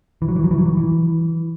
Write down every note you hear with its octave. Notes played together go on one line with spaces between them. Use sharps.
E3
F#3
E3
F#3
E3
F#3
E3
E3